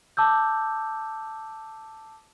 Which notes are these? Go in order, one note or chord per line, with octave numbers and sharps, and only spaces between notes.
A5 D6 E6 G6